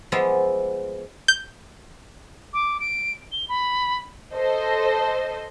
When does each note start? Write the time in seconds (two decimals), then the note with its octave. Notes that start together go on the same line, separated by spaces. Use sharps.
0.12 F3 G3 G#3 B3 F4 E5
1.28 G6
2.54 D6
2.80 D7
3.32 G7
3.49 B5
4.34 A4 C5 D#5